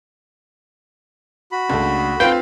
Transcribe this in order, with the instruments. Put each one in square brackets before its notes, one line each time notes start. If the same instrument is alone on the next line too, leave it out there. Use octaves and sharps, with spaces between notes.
[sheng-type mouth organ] F#4 B5
[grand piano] C#2 [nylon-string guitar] A3 D4
[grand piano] C4 F4 B4 [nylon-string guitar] F5 [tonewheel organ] G5